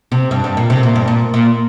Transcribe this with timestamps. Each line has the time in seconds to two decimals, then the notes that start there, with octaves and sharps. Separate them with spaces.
0.12 C3
0.31 G2
0.44 G2
0.57 A#2
0.70 C3
0.83 A#2
0.96 G2
1.08 A#2
1.34 A#2